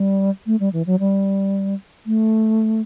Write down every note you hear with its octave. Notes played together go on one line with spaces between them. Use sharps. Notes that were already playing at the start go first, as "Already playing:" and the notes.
Already playing: G3
A3
G3
E3
F#3
G3
A3